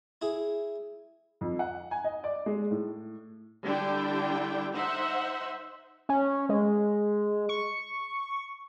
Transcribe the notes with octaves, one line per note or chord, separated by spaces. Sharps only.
E4 G#4
F2
F#5
G#5
D#5
D5
G#3
A2
D3 G3 D4 E4 G4 G5
D#4 C5 E5 F#5
C#4
G#3
C#6